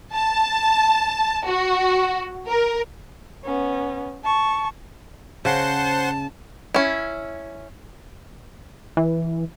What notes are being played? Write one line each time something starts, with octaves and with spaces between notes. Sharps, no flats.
A5
F#4
A#4
B3 C#4
A5 C#6
C#3 C5 F#5 A5 C6
C#4 E4
E3